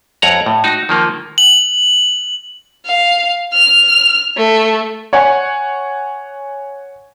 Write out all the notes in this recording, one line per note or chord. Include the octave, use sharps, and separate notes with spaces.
F2 C#5 F#5 A#5
A2
D#4 F#4
D#3 F3 A#3
F#7
F5
F6
A3
C#5 F#5 G#5 C#6